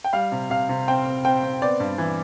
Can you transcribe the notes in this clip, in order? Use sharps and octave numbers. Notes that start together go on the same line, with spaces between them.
G5
G3 F5
C3
C3 F5
C3
C4 G5
C4
C4 G5
C4
B3 D5
G2
E3